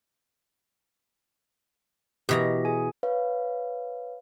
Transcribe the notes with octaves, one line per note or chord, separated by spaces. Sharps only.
B2 E3 G4 D#5 A#5
G#4 G#5
B4 C#5 F5